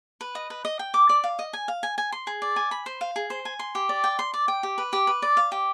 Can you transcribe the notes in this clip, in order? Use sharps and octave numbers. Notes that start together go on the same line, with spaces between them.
B4
D#5
B4
D#5
G5
D6
D5
F5
D#5
G#5
F5
G#5
G#5
C6
G#4
D5
G#5
B5
C5
F5
G#4
C5
G#5
C6
G4
D5
G5
C6
D5
G5
G4
B4
G4
B4
D5
F5
G4